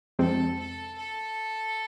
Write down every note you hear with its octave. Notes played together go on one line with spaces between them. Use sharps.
F2 C3 G#3 C4 A4
A4
A4